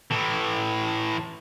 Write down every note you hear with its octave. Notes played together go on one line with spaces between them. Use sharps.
A2 E3